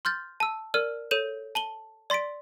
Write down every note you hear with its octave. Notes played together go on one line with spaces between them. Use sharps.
C6 F6 G6 A6
A5 E6
A#4 D5 F6 D#7
A4 C#5 G6 D#7 E7 F#7
A5 F#7 G7
D5 C6 A6 B6 D7